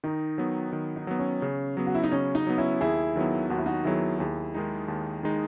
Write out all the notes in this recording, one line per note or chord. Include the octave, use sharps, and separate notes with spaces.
D#3 D#4
F#3 B3
D#3
D#4
F#3 B3
C#4
C#3
F#3 B3
F#4
E4
D#4
C#3 C#4
D#4
F#3 B3
C#4 E4
D#2 E4 G#4
D#3 F#3 B3
D#2 F#4
E4
D#4 F#4
D#3 F#3 B3 E4 G#4
D#2 E4 G#4
D#3 G#3 D#4
D#2
D#3 G#3 D#4